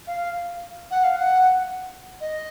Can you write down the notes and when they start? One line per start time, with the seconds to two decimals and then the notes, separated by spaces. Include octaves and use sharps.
0.07 F5
0.91 F#5
1.04 F5
1.16 F#5
2.21 D#5